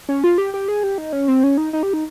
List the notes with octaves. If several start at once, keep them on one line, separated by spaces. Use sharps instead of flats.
C#4
F4
G4
G4
G#4
G4
D#4
C#4
C4
C#4
D#4
D#4
G4
D#4